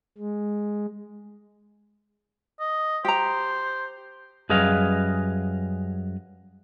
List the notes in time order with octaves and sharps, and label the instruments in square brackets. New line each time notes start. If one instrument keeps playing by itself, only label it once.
[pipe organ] G#3
[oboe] D#5
[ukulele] G4 A#5 [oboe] C5
[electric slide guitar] F#2 G3 G#4 B4 D#5 F5